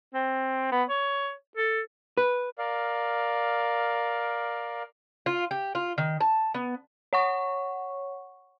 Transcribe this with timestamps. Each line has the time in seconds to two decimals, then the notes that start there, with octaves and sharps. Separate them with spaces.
0.14 C4
0.72 B3
0.90 C#5
1.57 A4
2.18 B4
2.58 A#4 D5 F5
5.26 F4
5.51 G4
5.75 F4
5.98 D#3
6.20 A5
6.54 B3
7.13 C#5 F#5 C#6